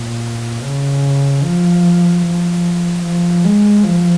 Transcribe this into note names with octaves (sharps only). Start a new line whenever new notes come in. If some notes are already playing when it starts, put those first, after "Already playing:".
Already playing: A#2
C#3
F3
F3
F3
G#3
F3